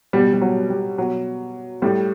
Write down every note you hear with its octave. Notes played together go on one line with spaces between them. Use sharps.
B2 G3
G3
F#3
G3
B2 F#3
A2 G3